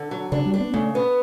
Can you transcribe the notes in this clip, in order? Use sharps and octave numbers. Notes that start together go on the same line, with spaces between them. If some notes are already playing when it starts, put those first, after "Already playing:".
Already playing: D3
F#3
C#3 D4
G3
D4
B3
C#3 A3
B3